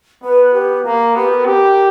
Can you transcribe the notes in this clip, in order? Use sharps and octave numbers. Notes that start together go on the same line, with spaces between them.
B3 B4
G4
A#3 A#4
B3 G4
A#4
G4